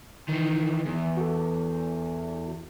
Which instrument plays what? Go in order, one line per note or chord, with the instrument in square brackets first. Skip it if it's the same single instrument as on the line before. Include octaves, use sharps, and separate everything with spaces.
[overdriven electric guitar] D#3 E3
E2
[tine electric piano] F#4 A4